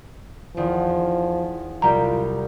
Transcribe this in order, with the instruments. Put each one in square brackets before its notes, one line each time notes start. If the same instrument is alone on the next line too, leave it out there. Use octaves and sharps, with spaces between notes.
[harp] E2 D#3 [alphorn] F3
[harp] C2 G3 G5 [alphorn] F4 [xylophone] A#5